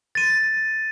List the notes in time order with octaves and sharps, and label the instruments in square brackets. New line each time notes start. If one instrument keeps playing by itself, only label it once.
[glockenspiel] A6 D#7